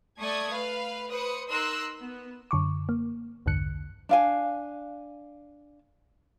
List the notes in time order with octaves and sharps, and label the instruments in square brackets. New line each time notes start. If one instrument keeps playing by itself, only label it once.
[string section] A3 A4 D5 C#6 D#6 G#6
B4 F5
B4 C5 D#6 C#7
D#4 A#4 C6 E6 F#6
B3
[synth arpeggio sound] F#2 D3 C#6 D6
A#3
B1 E2 G2 D3 F#6 C#7
[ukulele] D4 F5 G#5